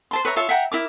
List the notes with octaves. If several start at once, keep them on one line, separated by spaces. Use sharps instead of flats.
C5 A5 C6
B4 C#5 E5 A#5
F4 C#5 E5 A5
E5 F#5 G5 A#5
E4 A#4 D6